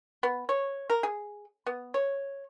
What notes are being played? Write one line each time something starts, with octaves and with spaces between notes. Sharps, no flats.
B3
C#5
A#4
G#4
B3
C#5